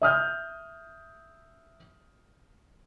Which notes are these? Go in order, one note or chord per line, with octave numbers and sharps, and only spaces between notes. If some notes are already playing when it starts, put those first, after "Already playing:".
E5 D#6 F6 G6